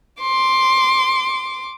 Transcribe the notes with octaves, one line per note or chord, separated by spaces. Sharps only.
C6 D6